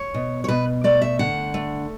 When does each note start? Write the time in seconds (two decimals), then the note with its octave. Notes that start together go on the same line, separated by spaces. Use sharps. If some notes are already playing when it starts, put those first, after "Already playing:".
Already playing: C#5
0.14 B2
0.44 C#5
0.48 B2 B4
0.84 A3 D5
1.02 E5
1.19 D3 F#5
1.54 A3